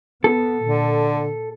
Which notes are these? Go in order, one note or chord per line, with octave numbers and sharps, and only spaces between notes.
B3 A4
A#2 D3